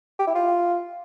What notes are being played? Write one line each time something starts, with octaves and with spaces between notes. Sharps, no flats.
G4
E4
F4